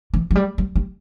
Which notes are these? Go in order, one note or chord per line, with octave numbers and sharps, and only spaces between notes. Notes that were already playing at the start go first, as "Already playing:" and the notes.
E3
F#3
G3
G3
G3